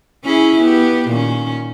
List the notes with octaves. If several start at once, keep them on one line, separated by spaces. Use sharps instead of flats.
C#4 E4 G#4
B3 G4
A#2 D#3 C#4